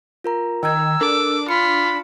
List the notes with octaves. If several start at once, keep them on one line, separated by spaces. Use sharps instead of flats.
F4 A#4 A#5
D#3 G5 A#5 E6 G#6
D4 A4 A#4 D6
F4 B5 C#7